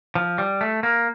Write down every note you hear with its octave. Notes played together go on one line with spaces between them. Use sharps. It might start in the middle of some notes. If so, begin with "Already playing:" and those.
F3
G3
A3
A#3